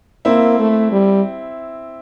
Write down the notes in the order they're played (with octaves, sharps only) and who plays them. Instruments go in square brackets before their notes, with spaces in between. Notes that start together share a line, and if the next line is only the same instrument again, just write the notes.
[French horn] A#3 [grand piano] C4 E4
[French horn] A3
G3